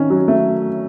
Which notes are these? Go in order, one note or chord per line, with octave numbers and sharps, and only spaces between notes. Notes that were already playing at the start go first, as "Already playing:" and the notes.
Already playing: D#3 C#4
F#3
A3